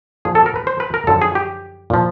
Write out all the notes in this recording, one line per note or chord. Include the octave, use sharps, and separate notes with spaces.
A#2 F3 G#4
A4
A#4
B4
C5
B4
A#4
F#2 D3 F3 A4
G#4
G4
A#2 F3